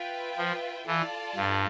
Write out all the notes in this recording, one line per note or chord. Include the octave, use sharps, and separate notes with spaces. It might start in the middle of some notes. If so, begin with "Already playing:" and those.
Already playing: F4 B4 E5 G5
F3
E3 F4 A4 D5 F5 A5
G2